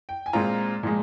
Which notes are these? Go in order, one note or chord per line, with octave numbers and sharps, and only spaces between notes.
G5
G#5
A#2 G#3 C4 F4 A#5
A#2 F3 G#3